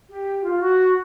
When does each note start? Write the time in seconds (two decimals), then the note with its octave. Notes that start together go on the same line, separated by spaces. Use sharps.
0.09 G4
0.44 F4
0.60 F#4